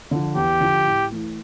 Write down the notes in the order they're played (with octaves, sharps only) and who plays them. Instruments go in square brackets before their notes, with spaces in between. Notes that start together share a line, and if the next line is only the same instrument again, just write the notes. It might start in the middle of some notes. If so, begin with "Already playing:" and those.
[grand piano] D3 F3
[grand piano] E2 [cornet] G4
[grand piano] D3 F3
A2
E3 A3